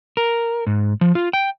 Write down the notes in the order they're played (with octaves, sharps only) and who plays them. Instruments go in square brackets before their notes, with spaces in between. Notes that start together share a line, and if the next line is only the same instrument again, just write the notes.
[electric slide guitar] A#4
G#2
F3
F4
G5